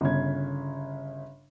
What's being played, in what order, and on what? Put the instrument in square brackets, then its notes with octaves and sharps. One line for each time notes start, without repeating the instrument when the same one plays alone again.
[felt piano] G1 C#3 G#6